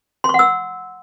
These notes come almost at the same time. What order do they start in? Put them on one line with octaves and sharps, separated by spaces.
C6 C#6 F#5 E6